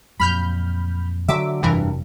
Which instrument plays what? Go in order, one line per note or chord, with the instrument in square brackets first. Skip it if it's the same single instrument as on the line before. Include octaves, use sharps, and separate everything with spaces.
[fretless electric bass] F2 A#2 F#3 [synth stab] B5 F6 G6
[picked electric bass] D3 F#3 [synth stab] E5 D6
[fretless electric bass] F1 C3 F#3 [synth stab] A#1 E3 A#4 [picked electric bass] G2